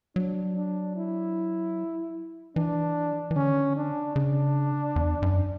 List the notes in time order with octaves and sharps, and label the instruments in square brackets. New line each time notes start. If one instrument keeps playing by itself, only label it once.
[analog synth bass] F#3 [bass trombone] D4
[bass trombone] D4
E4
[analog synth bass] E3 [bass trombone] D4
[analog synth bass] E3
[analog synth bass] D3 [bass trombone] C#4
[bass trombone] D4
[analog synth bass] C#3 [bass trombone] D4
[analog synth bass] E2
F#2